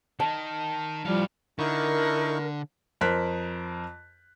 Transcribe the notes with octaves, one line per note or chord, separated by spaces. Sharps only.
D#3 A5
A2 F3 G3 F5
D3 D#4 E4 A#4 C#6
F2 A#4 C5 F#6 B6